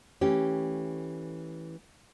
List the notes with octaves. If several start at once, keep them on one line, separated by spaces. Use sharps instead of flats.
E3 A3 C#4 G4